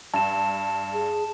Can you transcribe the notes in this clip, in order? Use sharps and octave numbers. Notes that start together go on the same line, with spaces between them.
G2 A5 E7
G#4